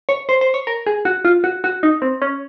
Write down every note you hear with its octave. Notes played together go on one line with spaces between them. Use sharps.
C#5
C5
C5
C#5
A#4
G#4
F#4
F4
F#4
F#4
D#4
C4
C#4